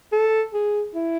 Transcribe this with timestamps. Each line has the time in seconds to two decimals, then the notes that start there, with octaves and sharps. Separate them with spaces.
0.12 A4
0.54 G#4
0.95 E4